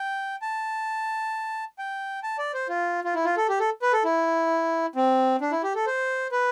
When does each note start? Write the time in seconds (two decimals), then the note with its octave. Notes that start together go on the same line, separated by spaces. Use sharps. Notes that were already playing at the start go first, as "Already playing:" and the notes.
Already playing: G5
0.42 A5
1.79 G5
2.23 A5
2.38 D5
2.54 C5
2.69 F4
3.04 F4
3.15 E4
3.25 F4
3.37 A4
3.49 G4
3.60 A4
3.82 B4
3.93 A4
4.05 E4
4.96 C4
5.41 D4
5.52 E4
5.63 G4
5.75 A4
5.86 C5
6.32 B4